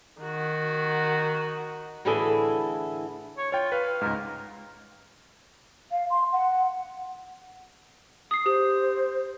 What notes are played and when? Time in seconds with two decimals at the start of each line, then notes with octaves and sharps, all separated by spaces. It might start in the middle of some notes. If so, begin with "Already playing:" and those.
0.22 D#3 F#4
2.05 A2 D3 E3 E4 G#4 A4
3.38 C#5
3.52 F4 C#5 G5
3.72 B4 F5
4.01 C#2 G#2 A#4
5.92 F5
6.10 C6
6.32 F#5
8.31 D#6 C7
8.46 G4 C5 D#6